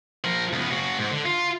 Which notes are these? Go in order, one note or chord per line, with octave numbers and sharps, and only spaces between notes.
F3 A#4
C#2 B3
C#3 F#4
G#2
D3
F4